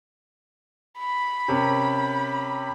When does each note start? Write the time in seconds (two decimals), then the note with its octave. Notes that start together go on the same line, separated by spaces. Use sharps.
0.98 B5
1.48 C3 C#4 A#4